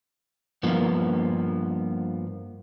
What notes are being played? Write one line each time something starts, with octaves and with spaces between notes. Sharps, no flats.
G2 F3 A#3 B3